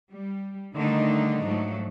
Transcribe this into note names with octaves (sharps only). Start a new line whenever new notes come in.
G3
D3 D#3 G3 A3 D4 D#4
G#2 F3 F#3 A3